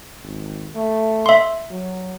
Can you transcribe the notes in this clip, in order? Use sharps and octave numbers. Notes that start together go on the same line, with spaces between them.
G#1
A3
E5 C6
F#3